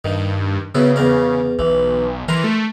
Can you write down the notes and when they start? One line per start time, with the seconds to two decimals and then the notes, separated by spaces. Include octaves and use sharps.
0.05 G2 D#3
0.75 C#3 F#3 B3 E4
0.96 E2 A#4 D5
1.59 B1 E3
2.28 E3 A#4 A#5 C6
2.44 A3